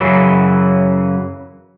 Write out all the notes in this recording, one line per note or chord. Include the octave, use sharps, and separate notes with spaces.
F#2 C#3 E3 F#3